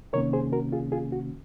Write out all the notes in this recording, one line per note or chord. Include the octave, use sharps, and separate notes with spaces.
C3 D#3 A#3 C#4 A#4 C#5
G#4 C5
F#4 A#4
F4 G#4
F4 G#4
F#4